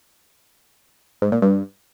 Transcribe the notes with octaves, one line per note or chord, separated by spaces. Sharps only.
G#2
A#2
G2